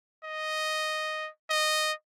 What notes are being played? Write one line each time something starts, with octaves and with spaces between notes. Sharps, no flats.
D#5
D#5